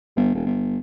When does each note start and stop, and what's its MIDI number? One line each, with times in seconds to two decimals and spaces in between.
0.16 0.32 31
0.35 0.42 28
0.46 0.78 31